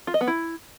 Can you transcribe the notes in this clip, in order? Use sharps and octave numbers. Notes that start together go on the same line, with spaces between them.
F4
D#5
B3
E4